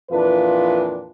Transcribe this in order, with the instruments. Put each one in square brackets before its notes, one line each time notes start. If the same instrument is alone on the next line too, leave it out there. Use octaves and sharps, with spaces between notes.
[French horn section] F2 A#2 E3 D4 F4 B4